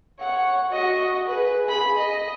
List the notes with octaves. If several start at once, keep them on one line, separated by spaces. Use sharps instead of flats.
C#5 F#5
F#4 D#5
G#4 B4
G#4 B5
D#5